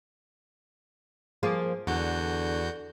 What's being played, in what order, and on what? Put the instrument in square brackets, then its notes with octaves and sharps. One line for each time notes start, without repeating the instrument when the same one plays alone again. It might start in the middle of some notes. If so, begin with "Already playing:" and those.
[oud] F3 A#3 G#4
[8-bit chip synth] E2 F#4 G6 [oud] D3